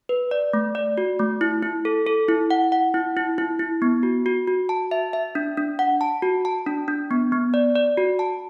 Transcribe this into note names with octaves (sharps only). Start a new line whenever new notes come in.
B4
D5
A3
D5
F#4
A3
E4
E4
A4
A4
E4
F#5
F#5
E4
E4
E4
E4
B3
F#4
F#4
F#4
A5
E5
E5
D4
D4
F#5
A5
F#4
A5
D4
D4
B3
B3
D5
D5
F#4
A5